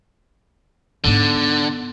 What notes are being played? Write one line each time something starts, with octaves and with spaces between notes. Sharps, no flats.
G#2 D3 B3